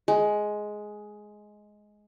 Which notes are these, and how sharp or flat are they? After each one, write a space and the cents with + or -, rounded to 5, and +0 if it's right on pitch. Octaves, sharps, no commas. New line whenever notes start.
G#3 +10